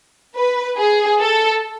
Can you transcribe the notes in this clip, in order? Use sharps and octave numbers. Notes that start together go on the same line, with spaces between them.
B4
G#4
A4